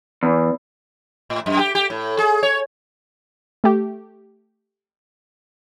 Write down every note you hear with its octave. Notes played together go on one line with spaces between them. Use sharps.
E2
A2
F#2
G4
G4
A2
G#4
C#5
A3 G4